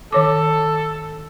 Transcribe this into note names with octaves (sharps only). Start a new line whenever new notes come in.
D#3 A4 C#5 D6